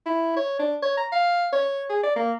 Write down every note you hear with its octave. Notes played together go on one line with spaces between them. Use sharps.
E4
C#5
D4
C#5
A#5
F5
C#5
G#4
D5
A#3